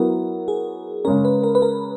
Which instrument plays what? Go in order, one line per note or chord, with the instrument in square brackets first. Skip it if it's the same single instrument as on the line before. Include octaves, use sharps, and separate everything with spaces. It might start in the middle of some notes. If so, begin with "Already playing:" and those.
Already playing: [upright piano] F#3 B3 E4 [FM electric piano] A#4
[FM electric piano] G#4
[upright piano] C#3 G#3 C#4 [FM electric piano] A#4
[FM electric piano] B4
A#4
B4
A#4